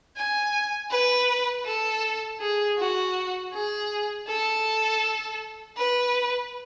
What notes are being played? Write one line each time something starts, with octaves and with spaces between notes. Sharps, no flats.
G#5
B4
A4
G#4
F#4
G#4
A4
B4